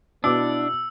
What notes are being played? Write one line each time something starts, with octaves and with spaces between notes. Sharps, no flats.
B2 B3 D4 E4 D6 E6